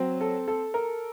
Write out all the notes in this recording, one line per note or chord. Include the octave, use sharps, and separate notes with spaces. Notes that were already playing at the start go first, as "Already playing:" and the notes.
Already playing: F#3 C4
A4
A4
A#4